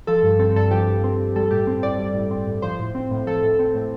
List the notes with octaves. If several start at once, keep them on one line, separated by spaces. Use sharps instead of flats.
F3 A4
G2
C4 A4
G2 A4
F3 G4
G2
C4
G2
G3 A4
A2 G4
C4
A2 D5
G3
A2
C4
A2
F3 C5
A2
C4
A2
F3 A4
A2
C4
A2